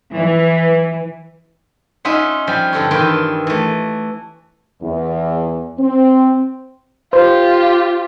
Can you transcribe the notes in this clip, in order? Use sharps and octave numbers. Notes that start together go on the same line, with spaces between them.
E3
C#4 D#4 F4 E5 F#5
F3 G3 C#4
G2 D3 A4 C#5
D#3 E3 F4 B4 G5
E3 A3
E2
C4
F4 G4 C5